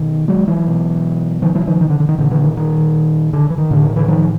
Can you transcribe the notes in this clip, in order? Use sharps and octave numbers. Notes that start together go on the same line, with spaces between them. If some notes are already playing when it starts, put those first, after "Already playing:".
Already playing: B2 D#3
F#3 G#3
E3 F#3
B2
D#3 F3
E3 F#3
D#3 F3
D#3
D3
D3
D#3
A#2 D3 E3
D3 E3
D#3
D#3
D3
E3
D#3
A2 D3
D#3
D3 E3
D#3 F3